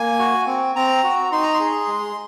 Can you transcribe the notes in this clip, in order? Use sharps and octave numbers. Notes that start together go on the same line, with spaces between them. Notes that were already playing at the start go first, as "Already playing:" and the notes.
Already playing: A#3 G#5
F#4
C4
C4 A#5
F#4
D#4 C6
A#5
C6
G#4
G#3